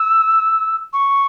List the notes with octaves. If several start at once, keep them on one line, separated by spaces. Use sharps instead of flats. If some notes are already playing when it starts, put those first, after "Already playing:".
Already playing: E6
C#6